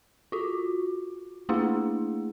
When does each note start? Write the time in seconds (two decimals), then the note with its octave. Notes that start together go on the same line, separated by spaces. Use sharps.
0.32 F4 F#4
1.49 A3 A#3 D4 E4 G#4